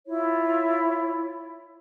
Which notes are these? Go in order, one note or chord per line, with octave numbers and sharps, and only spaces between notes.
E4 F4 C#5